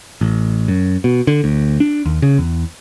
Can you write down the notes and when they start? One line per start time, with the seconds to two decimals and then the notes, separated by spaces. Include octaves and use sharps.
0.21 A1
0.68 F#2
1.04 B2
1.27 D3
1.44 D2
1.80 D4
2.05 D#2
2.22 C#3
2.38 E2